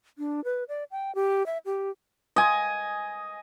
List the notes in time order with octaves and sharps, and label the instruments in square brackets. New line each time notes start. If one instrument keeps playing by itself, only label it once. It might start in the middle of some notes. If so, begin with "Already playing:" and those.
[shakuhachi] D4
B4
D5
G5
G4
E5
G4
[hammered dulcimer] D#5 G#5